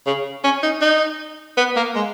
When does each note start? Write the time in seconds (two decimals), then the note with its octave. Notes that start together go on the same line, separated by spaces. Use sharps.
0.06 C#3
0.44 C#4
0.63 D#4
0.81 D#4
1.57 B3
1.76 A#3
1.95 G#3